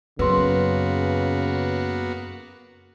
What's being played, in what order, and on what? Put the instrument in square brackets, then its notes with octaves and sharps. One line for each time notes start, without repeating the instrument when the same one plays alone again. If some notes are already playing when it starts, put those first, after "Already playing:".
[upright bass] F#2 [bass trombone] C#3 [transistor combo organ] A#3 B3 F#4 [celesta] B4 C6